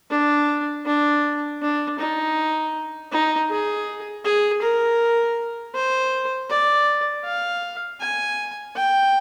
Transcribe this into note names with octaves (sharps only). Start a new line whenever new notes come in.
D4
D4
D4
D#4
D#4
G#4
G#4
A#4
C5
D5
F5
G#5
G5